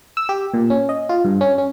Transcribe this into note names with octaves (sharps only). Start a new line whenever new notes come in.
E6
G4
A#2
C#4
D#5
F4
G2
C#4
C#4